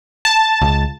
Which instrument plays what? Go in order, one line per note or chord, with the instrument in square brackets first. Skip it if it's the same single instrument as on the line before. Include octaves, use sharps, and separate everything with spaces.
[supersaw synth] A5
[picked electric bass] C#2